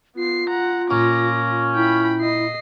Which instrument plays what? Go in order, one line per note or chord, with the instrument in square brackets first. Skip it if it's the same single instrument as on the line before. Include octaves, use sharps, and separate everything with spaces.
[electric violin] B3 C7 [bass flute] F4
[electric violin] F#5 A#5
[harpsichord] A#2 [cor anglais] C#4 [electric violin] D6 A#6
[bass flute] E4 [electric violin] G5 B5
[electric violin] D#5 C7